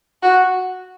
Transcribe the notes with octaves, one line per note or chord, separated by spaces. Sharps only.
F#4